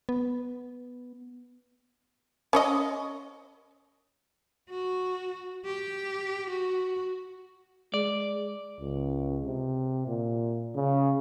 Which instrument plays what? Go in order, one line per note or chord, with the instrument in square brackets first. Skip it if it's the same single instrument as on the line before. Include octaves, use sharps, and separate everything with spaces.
[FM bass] B3
[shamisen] C#4 C#5 D#5
[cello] F#4
G4
F#4
[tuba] G#3 [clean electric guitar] D5
[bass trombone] C#2
C3
A#2
C#3